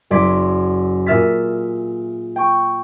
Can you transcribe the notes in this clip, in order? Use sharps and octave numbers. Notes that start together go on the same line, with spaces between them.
F#1 F#2 D5 C6 G#6 B6
A#2 G#4 E5 F6 A6 B6
G5 C#6